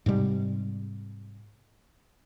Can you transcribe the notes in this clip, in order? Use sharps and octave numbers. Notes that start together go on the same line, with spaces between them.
G#2 C3 G3